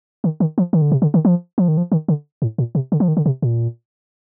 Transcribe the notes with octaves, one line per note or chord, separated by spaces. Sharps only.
D#3
D#3
F3
D#3
D3
C3
D3
D#3
F3
F3
D#3
F3
D#3
D3
A2
A#2
C3
D3
F3
D#3
D3
C3
A#2